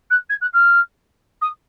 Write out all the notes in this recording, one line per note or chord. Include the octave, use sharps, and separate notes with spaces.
F#6
G#6
F#6
F6
D#6